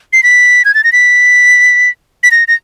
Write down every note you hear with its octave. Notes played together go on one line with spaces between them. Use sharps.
C7
B6
G#6
A6
A#6
B6
B6
A#6
A#6